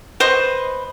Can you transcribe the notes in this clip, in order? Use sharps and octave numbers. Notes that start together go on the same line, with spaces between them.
B4 C5 D#5 C#6